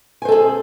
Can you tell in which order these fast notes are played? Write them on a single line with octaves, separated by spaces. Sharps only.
G#5 C5 A4 G#4